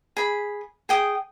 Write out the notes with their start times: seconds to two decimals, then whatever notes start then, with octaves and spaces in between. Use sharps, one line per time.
0.17 G#4 B5
0.89 G#4 G5 D#6